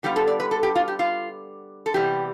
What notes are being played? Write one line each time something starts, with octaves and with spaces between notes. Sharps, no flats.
D3 G3 B3 F4 G4
A4
D5
B4
A4
G4
F4
G4
F4
A4
C3 E3 G3 B3 G4